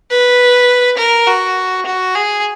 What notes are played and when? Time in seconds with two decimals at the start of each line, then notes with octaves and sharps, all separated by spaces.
0.10 B4
0.98 A#4
1.27 F#4
1.86 F#4
2.15 G#4